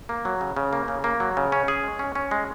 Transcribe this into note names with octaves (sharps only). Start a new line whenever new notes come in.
A#3
F#3
C#3
C#3
A#3
C#3
A#3
F#3
C#3
C#4
G#4
G#3
C#4
C#4
G#3